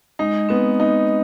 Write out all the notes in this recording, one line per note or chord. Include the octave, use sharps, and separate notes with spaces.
G#3 D#4
B3 C4
D#4